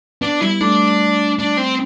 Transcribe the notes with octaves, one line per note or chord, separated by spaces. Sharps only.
B3 D4
G3 E4
A3 D4
D4
C4